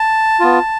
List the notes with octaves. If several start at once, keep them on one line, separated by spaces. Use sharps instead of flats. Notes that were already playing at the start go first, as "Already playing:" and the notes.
Already playing: A5
B3 F4